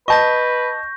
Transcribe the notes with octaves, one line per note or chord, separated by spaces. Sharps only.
B4 D#5 A5 C#6 G6 A#6